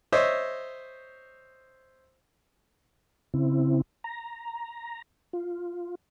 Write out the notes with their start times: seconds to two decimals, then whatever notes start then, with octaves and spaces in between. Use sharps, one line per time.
0.12 C5 C#5 D#5 E5 C6
3.34 C#3 C4 E4
4.04 A#5
5.33 F4